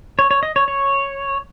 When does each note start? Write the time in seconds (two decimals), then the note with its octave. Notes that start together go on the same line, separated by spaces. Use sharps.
0.19 C#5
0.31 C#5
0.43 D#5
0.56 C#5
0.68 C#5